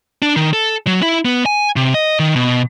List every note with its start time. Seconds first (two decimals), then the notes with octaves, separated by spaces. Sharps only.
0.22 D4
0.36 D#3
0.53 A4
0.87 F#3
1.02 E4
1.25 B3
1.46 G#5
1.76 C3
1.94 D#5
2.19 D#3
2.36 B2